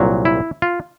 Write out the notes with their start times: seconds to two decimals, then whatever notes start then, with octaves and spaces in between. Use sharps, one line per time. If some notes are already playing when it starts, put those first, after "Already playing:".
Already playing: C2 A#2 F#3
0.25 E4
0.62 F4